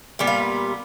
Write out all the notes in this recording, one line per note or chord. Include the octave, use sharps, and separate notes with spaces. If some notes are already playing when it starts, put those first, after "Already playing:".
A#2 G3 B3
F5